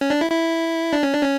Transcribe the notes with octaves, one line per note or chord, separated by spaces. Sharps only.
C#4
D4
E4
E4
D4
C#4
D4
C#4